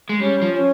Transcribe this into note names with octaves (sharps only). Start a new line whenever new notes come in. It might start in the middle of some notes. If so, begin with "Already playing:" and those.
G#3
G3 C#4
F3
C#4